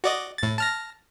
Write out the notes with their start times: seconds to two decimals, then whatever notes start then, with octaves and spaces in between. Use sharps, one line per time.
0.04 F#4 D5 D#5
0.38 A2 A6
0.58 A5 F6 A#6